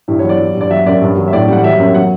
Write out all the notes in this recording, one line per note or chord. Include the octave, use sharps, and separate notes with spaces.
G2 E4
C#5
F#3
D5
F#3
G2
D5
F#3 E5
F#2 D5
G2
F#3
E5
A2 D5
G3 F#5
F#3 E5
F#2
F#3 F#5